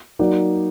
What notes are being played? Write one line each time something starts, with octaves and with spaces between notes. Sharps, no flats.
F#3 A#3 D#4 F#4 D5